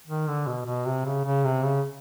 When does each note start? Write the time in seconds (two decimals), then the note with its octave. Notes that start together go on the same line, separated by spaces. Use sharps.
0.07 D#3
0.27 D3
0.47 B2
0.66 B2
0.86 C3
1.05 C#3
1.25 C#3
1.44 C3
1.64 C#3